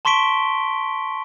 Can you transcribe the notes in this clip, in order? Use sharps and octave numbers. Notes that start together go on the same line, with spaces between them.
A5 C6 C#6 B6 D7 G7